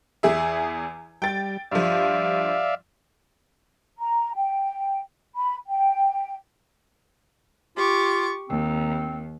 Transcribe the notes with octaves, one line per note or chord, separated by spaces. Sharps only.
E2 G#4 E5
G3 G5 A6
G2 F3 D5 E5 F5
A#5
G5
B5
G5
F4 G4 C#6 D6
D#2 C4